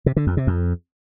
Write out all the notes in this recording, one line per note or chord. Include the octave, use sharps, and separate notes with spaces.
C3
D3
F2
C3
F2